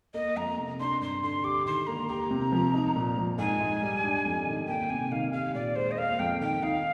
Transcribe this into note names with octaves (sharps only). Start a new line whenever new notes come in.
A#3 D#5
F2 A#5
C3
D4 C6
G2 C6
D3 C6
G4 D6
D#3 C6
A#3 A#5
G4 A#5
C3
F3
D#4
A#2
F3
G#2 G#5
G#2
G3
D4
F2
D#3
A#3 G5
C3 G#5
D#3 F5
G4 F5
A#2 D5
G#3 C5
D#5
A#3 F5
F2 G5
D#3 G5
D#4 F5